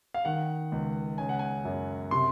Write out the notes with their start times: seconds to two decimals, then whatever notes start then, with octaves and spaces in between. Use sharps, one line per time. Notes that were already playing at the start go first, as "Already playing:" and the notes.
0.14 F5
0.25 D#3 F#5
0.72 C#2
1.18 C#3 G#5
1.29 F#5
1.39 G#5
1.65 F#2
2.11 C3 C6